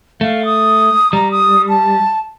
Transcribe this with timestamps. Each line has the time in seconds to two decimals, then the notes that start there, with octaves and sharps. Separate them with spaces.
0.21 A3 F5
0.45 D#6
1.13 G3 A#5
1.31 D#6
1.69 A5